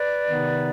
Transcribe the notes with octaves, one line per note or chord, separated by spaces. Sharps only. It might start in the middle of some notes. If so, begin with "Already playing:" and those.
Already playing: B4 D5
C3 D#3 B3 D#4